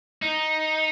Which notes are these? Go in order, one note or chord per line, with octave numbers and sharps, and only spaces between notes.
D#4